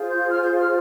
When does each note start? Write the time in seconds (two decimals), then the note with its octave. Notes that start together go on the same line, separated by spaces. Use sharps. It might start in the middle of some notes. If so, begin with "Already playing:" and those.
Already playing: F4 G#4 C5
0.10 G6
0.29 F6
0.44 G6
0.59 F6